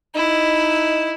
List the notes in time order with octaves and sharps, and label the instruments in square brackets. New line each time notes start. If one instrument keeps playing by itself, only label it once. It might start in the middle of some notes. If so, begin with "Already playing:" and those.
[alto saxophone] D#4 [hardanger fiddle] E4